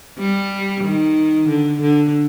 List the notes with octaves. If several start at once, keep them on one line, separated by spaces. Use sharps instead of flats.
G3
D#3
D3
D3